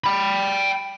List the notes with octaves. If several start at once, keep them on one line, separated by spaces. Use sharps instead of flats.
G5 B5